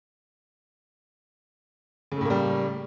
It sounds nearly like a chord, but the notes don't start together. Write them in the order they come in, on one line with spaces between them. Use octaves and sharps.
C#3 A3 A2 A#3 G3